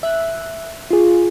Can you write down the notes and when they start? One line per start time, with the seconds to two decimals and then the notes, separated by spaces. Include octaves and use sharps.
0.03 E5 F#6
0.90 F4 G#4